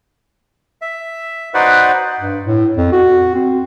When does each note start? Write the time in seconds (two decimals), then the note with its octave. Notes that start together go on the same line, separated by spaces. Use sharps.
0.82 E5
1.54 D#4 F#4 B4 C5 D5 F#5
2.20 G2
2.46 A2
2.77 F2
2.92 F#4
3.34 C4